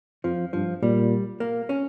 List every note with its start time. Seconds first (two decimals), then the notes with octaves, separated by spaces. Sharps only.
0.24 F2 F3
0.53 G2 F3
0.82 A#2 G3
1.40 A#3
1.69 C#4